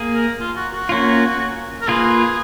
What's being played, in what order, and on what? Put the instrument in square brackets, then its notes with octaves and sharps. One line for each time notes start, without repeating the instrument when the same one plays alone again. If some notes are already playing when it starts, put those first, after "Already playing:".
Already playing: [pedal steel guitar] A#3 G#4
[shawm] A#4
F4
F#4
F#4
[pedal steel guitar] A#3 C#4 F4
[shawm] A#4
[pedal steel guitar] A#3 F4 B4 [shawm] G#4